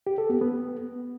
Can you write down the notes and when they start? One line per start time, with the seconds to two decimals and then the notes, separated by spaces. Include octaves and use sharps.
0.07 G4
0.18 A4
0.30 B3
0.41 B3